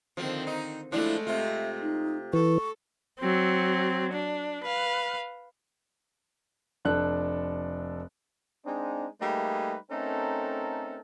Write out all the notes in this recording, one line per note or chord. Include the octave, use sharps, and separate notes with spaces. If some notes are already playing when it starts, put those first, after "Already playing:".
D3 D#3 F3 C4
D#4
F3 G#3 A3 D4 E4
C3 F4 E5
D#4
E3 A4 C#6
F#3 C4
D4
B4 F5
F1 D4 A4 F#6
G#3 C4 D4 D#4
G3 A3 A#3 D#4 G#4 B4
A3 C4 C#4 D#4 A4 A#4